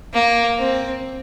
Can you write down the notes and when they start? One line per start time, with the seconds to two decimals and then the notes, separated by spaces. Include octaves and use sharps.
0.13 A#3
0.58 C4